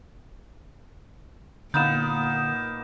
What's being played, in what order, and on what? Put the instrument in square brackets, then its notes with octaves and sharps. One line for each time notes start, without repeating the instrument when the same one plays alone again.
[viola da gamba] A#2 [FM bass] D3 [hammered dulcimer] A#3 B3 D#4 [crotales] G6 E7